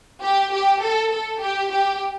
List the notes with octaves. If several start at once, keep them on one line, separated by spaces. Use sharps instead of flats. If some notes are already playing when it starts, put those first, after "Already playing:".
G4
G4
A4
A4
G4
G4